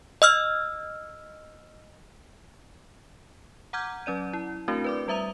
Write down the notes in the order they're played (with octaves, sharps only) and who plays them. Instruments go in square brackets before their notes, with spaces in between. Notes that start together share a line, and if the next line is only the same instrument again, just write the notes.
[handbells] D#5 E6 F6
[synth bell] F#5 A#5 D6 F6 G6 G#6
F#3 C#4 D5 D#7
E4
A3 C4 D4 E4 F#4 A#4
B4 D5 D6
G3 B4 E5 A#5 D#6 F7